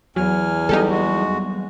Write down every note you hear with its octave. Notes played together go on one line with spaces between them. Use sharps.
E2 F#3 G#5 F6
F#3 G3 B3 D#4 G4 A4
G#3 F#4